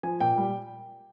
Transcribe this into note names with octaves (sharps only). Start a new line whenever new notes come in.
F3 G#5
A#2 G5
G3